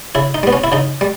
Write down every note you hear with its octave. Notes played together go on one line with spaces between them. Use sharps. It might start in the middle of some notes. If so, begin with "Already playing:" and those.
C#3 E4
D#4
G3 B3
C#4
E4
C#3 D#4
G3